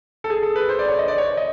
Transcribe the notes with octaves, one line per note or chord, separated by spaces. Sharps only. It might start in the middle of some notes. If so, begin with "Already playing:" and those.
A4
G#4
A4
B4
C5
D5
C#5
D#5
D5
C#5
D#5